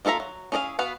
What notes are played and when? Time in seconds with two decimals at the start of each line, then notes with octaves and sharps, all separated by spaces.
0.05 A#3 F4 A4 E5 A#5
0.20 F#3
0.52 C#4 E4 G#4 D5 F5
0.79 B3 F#4 B4 F5